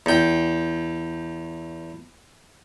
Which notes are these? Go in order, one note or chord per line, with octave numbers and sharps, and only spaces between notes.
E2 G5